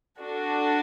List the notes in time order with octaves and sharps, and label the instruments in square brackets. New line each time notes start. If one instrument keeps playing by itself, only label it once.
[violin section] D4 F#4 A4